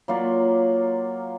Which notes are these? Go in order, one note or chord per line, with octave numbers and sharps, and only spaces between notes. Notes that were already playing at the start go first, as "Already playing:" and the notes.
F#3 A#3 F4 D5